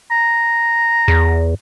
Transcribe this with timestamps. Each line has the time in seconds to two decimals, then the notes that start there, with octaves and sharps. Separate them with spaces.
0.11 A#5
1.08 E2